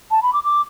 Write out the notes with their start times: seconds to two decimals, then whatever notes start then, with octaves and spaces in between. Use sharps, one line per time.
0.11 A5
0.23 B5
0.33 D6
0.44 D6